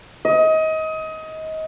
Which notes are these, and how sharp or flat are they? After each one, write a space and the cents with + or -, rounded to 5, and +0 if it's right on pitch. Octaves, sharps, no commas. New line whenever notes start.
D#5 +25